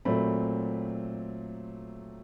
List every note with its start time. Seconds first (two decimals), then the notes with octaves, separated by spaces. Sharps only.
0.05 A#2 F#3 A3 C4 B5